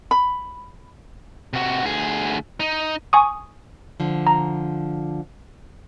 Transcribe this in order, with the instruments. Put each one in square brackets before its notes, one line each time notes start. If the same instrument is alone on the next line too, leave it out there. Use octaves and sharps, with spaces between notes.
[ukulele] B5
[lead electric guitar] C3 F#4
D2 G#4
D#4
[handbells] G#5 C#6 D#6
[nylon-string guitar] D3 F3
[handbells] A#5